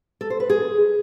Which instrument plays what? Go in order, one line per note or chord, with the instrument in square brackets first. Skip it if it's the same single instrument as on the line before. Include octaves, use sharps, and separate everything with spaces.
[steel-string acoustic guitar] A4
C5
B4
G#4